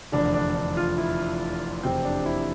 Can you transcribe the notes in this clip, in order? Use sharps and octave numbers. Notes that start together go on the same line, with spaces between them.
F1 E2 D3 D4
D4
D4
F4
E4
F1 E2 C3 C4
D4
E4